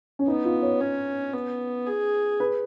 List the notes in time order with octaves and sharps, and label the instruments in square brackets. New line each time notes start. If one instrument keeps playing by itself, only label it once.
[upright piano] C#4
[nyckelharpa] B3 [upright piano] D#4
[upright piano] F4
C#5
[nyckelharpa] C#4
B3
G#4
[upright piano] B4